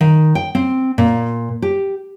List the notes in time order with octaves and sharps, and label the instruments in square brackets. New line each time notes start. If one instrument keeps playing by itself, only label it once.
[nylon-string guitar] D#3
G5
C4
A#2
G4